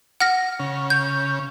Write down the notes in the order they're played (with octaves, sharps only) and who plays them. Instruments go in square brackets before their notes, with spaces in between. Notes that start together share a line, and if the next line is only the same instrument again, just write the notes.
[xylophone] F#5 F6 A#6
[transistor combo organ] C#3
[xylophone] G6